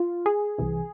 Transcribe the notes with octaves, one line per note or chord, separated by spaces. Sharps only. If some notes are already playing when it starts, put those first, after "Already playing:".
Already playing: F4
G#4
C2 C3 E3